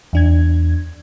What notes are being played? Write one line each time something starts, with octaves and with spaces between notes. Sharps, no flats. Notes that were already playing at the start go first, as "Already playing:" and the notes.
E2 D4 G#6